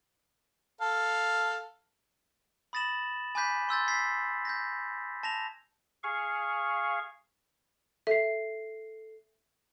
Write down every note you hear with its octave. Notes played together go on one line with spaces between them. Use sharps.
A4 F5
B5 D#6 A6 A#6 E7 F#7
G#5 B5 D6 F#6 G6 B6
C6 E6 G6 A6
G#6 B6 C7
G6 G#6 A#6
A5 A#6 F7
G#4 F5 C#6
A4 E5 C7